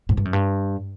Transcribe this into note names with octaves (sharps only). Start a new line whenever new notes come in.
G#2
G2
F#2
G2